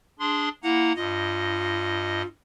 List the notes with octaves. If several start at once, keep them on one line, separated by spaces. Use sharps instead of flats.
D4 G#4 C6
A#3 E4 F#5 A#5
G2 F4 D#5